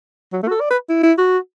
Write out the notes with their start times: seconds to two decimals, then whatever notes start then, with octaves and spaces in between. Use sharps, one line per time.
0.32 F#3
0.43 A3
0.48 F#4
0.51 A4
0.61 D5
0.71 B4
0.89 E4
1.03 E4
1.18 F#4